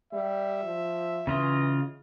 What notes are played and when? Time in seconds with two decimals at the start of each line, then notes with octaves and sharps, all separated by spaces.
0.13 G3 E5
0.64 F3
1.27 C#3 E3 F4 D#5